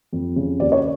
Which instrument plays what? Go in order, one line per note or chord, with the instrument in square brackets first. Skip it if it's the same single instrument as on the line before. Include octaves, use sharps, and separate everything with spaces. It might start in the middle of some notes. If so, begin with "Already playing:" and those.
[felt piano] F2
C#3
D#2 D5
C#5